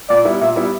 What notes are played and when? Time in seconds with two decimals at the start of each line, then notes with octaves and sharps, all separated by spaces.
0.09 A#2 D5
0.25 G3 B3 E4
0.41 A#2 E5
0.56 G3 B3 E4